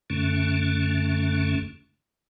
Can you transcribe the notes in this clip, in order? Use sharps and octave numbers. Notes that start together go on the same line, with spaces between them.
F#2 D3 A3 C#4